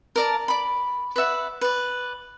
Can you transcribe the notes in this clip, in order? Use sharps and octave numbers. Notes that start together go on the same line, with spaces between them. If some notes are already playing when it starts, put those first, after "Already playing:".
A#4 D5 A5
D5 B5
B4 D5 E5 F#5
B4 D5